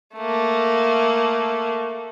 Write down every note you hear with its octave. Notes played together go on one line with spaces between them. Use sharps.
A3 A#3